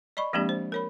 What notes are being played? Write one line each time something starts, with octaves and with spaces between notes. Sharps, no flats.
D5 D#5 B5 C#6
F3 G#3 A#3 C4 D4 G4
C5
A#4 C#5 B5